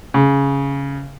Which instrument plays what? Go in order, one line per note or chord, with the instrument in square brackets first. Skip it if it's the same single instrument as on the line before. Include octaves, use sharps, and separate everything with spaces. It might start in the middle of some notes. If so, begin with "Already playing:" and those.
[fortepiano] C#3